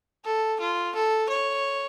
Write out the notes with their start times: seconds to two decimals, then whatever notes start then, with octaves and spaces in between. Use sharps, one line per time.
0.25 A4
0.60 F4
0.95 A4
1.29 C#5